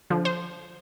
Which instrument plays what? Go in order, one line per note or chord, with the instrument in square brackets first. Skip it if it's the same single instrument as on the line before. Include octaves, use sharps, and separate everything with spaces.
[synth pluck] D3 F3
C5